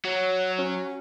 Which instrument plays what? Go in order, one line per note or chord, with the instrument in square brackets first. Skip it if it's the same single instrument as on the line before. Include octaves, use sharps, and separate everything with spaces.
[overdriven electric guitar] F#3 [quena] C#5
[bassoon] C#4 [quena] F#4